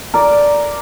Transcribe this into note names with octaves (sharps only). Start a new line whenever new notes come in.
A#4 D5